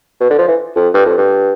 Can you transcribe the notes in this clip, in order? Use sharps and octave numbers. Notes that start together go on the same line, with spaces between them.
B2
D3
F3
E3
F2
G2
F2
G2